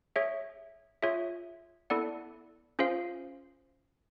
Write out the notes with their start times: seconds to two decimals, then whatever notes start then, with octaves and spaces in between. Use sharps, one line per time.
0.16 G#4 C#5 E5
1.02 F4 G#4 C#5 E5
1.90 B3 E4 A4 D5 F#5
2.79 C#4 F4 G#4 C5 F5